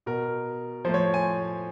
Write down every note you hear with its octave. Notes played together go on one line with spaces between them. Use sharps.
B2 A#4
A2 F3 C5
C#5
G#5